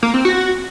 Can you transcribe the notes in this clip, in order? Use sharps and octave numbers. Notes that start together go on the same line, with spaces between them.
A#3
C4
F#4